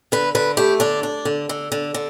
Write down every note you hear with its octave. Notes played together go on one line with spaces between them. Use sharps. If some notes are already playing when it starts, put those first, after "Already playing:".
D3 B4
D3 B4
A3 G4
D3 D4
D4
D3
D3
D3
D3